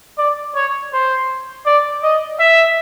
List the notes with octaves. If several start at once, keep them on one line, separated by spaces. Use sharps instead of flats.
D5
C#5
C5
D5
D#5
E5